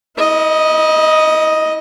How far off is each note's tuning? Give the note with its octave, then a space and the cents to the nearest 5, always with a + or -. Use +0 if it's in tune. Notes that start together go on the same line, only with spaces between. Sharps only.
E4 -40 D#5 +0